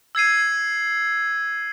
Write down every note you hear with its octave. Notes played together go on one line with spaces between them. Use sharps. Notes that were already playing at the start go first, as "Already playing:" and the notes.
E6 G#6 C7 D#7